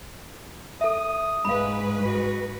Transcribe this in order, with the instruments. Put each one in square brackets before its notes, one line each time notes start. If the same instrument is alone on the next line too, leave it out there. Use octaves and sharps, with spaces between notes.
[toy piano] A4 E5 [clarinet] D#6
[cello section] G#2 B4 [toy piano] F5 B5
[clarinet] F#4